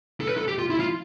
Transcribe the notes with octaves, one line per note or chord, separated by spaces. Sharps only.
A4
B4
A4
G4
F4
E4
F4